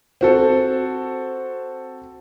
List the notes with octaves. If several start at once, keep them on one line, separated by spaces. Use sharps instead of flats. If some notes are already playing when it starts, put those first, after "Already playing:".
C4 F#4 A4